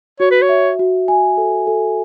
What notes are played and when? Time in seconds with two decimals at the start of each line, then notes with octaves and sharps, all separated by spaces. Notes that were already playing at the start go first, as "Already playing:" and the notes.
0.20 F#4 C#5
0.31 B4
0.42 C#5
0.49 E5
0.79 F#4
1.08 G#5
1.37 A4
1.67 A4